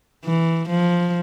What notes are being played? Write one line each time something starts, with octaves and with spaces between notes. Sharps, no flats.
E3
F3